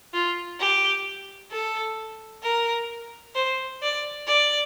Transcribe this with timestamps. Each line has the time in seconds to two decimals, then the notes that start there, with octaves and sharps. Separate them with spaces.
0.13 F4
0.60 G4
1.51 A4
2.43 A#4
3.35 C5
3.82 D5
4.28 D5